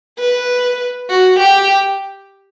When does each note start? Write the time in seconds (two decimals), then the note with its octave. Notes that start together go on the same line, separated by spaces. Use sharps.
0.19 B4
1.10 F#4
1.40 G4